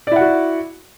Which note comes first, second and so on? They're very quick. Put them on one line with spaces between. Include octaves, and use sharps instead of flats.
D5 E4 F#5 F#4